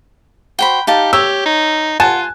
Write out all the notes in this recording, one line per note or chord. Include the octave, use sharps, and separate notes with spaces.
F#4 C5 G5 B5
D#4 G4 F5 A5
G4 C#5 E6
D#4
F4 F#5 G#5 A5